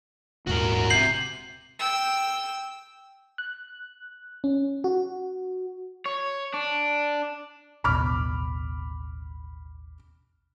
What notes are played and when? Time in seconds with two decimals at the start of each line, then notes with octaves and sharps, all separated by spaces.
0.47 D#1 D#2 G#2 F#4 A#4
0.90 C3 G6 C7 F#7
1.79 G5 E6
3.38 F#6
4.44 C#4
4.84 F#4
6.05 C#5
6.54 D4
7.84 A1 D#2 B2 B5 D6 F6